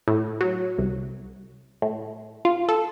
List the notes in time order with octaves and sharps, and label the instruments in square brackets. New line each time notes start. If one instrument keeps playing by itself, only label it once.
[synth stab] A2
F#3
C2
A2
F4
A4